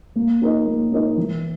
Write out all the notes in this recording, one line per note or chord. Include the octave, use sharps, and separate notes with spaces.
A#3
D#4 A#4 D#5
A#3
D#4 A#4 D#5
E3